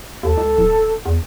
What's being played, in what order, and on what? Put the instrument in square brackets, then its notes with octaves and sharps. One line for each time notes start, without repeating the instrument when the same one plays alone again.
[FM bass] D#2 [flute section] A4
[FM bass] C#2
D1
E2